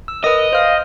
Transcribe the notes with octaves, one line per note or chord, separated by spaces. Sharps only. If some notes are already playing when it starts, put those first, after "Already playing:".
E6
A#4 B4 D#5 D#6
C5 F5 F6